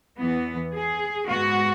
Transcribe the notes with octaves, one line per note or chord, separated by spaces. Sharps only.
E2 E3 B3
G#4
G#2 G#3 B3 F#4